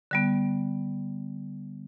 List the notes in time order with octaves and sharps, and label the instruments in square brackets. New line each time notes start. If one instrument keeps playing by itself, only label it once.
[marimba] D3 G3 B3